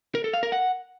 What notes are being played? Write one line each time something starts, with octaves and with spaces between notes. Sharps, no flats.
A#4
A4
F5
A#4
F#5